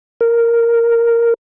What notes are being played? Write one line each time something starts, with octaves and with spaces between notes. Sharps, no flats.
A#4